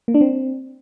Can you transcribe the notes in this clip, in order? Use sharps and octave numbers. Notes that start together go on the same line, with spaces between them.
A#3
D4
C4